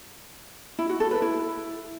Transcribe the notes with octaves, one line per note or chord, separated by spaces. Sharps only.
E4
F#4
A4
B4
E4